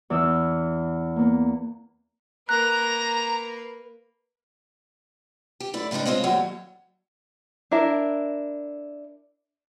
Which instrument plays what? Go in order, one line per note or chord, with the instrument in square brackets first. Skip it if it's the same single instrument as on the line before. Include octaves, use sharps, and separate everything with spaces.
[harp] E2 E3 D#6 E6
A#3 B3
[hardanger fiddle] A#3 B4 [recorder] A#5 [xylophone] F#6
[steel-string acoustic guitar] G4
F#2 A3 E4 D5
A2 C#3 G#3 D4 D#4
G#3 C4 F4 C#5 D#5
D#2 A2 F#3 G3 C#5
[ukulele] D4 E4 A#4 E5